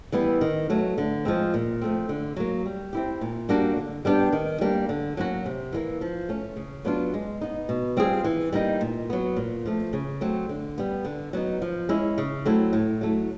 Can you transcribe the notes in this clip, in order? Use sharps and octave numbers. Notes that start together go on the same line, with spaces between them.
E3 G3 B3 E4
D#3
F#3 A3
D3
F3 G#3 C4
A#2
F3 A3 C4
D3
F#3 A#3
G3
C4 E4 G4
A#2
G3 A#3 D4 F#4
D3
G3 B3 D4 G4
D#3
G3 A#3 D4
D3
F#3 A#3 C#4 F#4
C3
E3 G3 A#3
F3
A3 C#4
C#3
F#3 B3 D4 F4
G#3
B3 D#4
B2
G3 C4 F4 G#4
E3
G3 A#3 D#4
A#2
F#3 B3
A#2
F3 A3
C#3
F#3 A3 C4
D3
G3 B3
D3
F#3 B3 D#4
F3
G#3 C#4 E4
C#3
F#3 A3 C4 E4
A2
F#3 A3